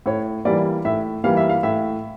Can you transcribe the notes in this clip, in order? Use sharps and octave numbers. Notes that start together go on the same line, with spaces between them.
A2 C#5
E3 G3 A#3 D5
A2 E5
E3 G3 A#3 F5
E5
F5
A2 E5